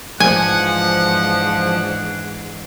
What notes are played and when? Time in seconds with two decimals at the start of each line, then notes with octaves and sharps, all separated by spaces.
0.20 G#2 E3 F3 D4 F#5 G#5